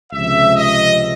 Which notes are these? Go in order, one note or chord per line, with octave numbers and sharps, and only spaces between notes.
C#2 C3 F3 E5
D#5